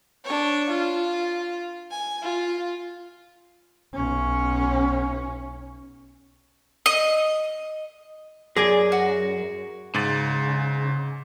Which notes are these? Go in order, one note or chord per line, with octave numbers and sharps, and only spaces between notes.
D4 C#5
F4
G#5
F4
B1 C#4
D#5
F#2 G#4 D5 G#5 A#6 D7
F#4
G#2 C#3 A6